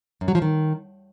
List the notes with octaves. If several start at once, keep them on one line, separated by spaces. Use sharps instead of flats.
F#2
F#3
F3
D#3